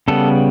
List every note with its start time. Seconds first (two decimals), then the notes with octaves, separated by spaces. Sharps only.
0.08 C#3 G3 B3 A4